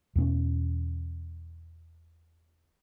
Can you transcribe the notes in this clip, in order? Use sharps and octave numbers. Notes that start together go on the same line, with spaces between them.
E2 B2 B3 C#4